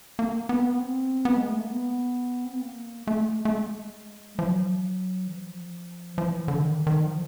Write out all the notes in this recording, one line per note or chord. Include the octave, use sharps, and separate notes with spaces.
A#3
B3
C4
B3
G#3
A3
A#3
B3
C4
B3
A#3
A3
A3
G#3
F3
F#3
E3
F3
F3
E3
D3
D#3
D#3
F3